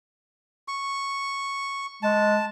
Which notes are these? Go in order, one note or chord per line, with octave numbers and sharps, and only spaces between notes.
C#6
G#3 A5